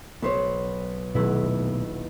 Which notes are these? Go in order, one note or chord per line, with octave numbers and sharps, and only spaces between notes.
B1 B3 C5 C#5
D#1 B2 F#3 A3 E4 B4